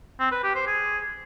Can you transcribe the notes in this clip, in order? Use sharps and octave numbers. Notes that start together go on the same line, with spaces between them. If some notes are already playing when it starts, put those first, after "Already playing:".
C4
B4
G4
C5
G#4